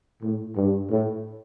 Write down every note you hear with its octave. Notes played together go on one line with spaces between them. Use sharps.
A2
G2
A2